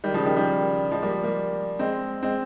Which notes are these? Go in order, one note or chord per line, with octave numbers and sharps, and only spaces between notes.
D#3 G3
C#3 F3
D#3 G3
D#3 G3
F3 G#3
G3 A#3
G3 A#3
G#3 C4
G#3 C4